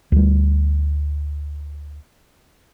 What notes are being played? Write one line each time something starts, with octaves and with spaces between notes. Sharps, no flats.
D2 G3